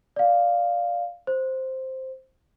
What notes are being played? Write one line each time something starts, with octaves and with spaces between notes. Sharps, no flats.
D5 F5
C5